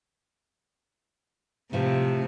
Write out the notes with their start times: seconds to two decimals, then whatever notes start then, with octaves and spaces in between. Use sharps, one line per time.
1.73 A2 C3 F3